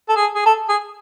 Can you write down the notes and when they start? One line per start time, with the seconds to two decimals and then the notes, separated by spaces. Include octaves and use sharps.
0.09 A4
0.16 G#4
0.35 G#4
0.46 A4
0.69 G#4